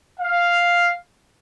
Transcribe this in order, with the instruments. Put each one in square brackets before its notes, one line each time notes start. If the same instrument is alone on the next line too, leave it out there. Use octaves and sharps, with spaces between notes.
[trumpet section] F5